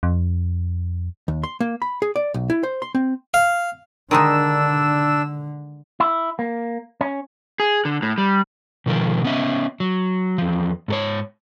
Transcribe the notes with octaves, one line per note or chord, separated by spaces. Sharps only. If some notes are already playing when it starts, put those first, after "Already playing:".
F2
D#2
C6
A#3
B5
G#4
D5
B1
E4
C5
C6
C4
F5
D3 D#3 G#3 D4 D#4 E6
E4
A#3
C#4
G#4
D3
A2
G3
B2 D#3 F3 A#4
B3 C#4 E5
F#3
E2 F3
G#2 A4 C#5